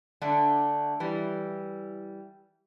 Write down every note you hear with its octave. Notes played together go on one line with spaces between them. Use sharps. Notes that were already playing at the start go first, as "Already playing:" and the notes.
D3 A3 D4
E3 G3